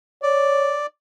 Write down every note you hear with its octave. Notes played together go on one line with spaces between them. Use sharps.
C#5 D5